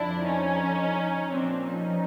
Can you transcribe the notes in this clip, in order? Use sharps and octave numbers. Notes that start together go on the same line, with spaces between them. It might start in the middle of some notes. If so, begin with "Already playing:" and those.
Already playing: F2 D3 F3 D4 E4
C#4 D#4
A#2 F3 C4 D4
C#4 D#4